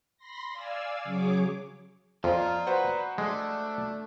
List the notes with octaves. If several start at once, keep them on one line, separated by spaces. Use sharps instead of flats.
B5 C6 A#6
D5 F5 G#5 E6
C#3 F#3 G#4 C#5 D6
F2 F4 D5 A#5
F#4 B4 C5 F#5
G#3 A3 D4